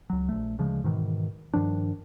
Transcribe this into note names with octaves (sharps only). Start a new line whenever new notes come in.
C#2 F#3
A#1 A3
D2 C#3 F3 G#3
G#2 B2 D#3 E3
G2 D#3 F3 D4